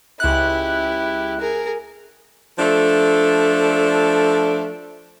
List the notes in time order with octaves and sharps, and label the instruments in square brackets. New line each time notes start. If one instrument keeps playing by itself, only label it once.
[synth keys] C#2 F#6 [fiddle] E4 G4
[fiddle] G#4 A#4
[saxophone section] F3 A3 D4 A4